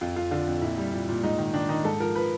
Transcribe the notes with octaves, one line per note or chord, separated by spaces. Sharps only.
F2 F4
F2 F4
D3 F4
F2
A#2 E4
G3
A#2
A#2
G#2 D#4
D#3
D#3 D4
D#3 D#4
G#2 A4
F3 A#4
F3 B4